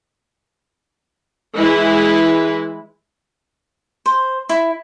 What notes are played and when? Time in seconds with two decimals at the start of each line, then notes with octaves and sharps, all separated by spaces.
1.56 E3 G#3 E4 B4
4.06 C5
4.49 E4